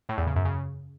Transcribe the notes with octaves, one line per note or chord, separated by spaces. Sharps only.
A2
E2
C#3
F#2
C#3